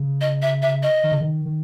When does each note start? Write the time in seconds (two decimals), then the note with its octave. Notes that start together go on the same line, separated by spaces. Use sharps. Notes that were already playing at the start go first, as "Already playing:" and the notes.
Already playing: C#3
0.21 D#5
0.42 E5
0.62 E5
0.83 D#5
1.04 D#3
1.12 C#3
1.21 D#3
1.45 D#3